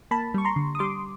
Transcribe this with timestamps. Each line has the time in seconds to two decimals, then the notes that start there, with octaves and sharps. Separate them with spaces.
0.11 A#3 A5 B5
0.34 G3 C#6
0.45 A#5 C6
0.56 D3
0.75 D#6
0.79 G3 C6 D6